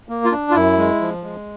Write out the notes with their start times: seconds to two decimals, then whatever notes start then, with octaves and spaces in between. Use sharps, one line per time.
0.09 A#3
0.24 F4
0.31 D4
0.51 F4
0.55 F#2 E4
0.78 G#3
1.00 F3
1.23 G#3